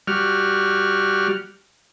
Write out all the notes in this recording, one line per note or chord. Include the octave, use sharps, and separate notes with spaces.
G3 F#4 F6